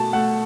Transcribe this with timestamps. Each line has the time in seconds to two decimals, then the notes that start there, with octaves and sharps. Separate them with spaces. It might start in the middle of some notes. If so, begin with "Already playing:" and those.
Already playing: B2 A3 A5
0.13 A3 F#5